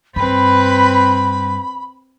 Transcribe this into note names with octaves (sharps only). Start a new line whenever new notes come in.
G2 C4 B4 B5